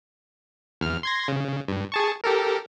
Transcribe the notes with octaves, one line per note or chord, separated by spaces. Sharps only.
E2 F6
C6 G#6 A#6
C#3
G2
G#4 A5 C#6
G4 A4 A#4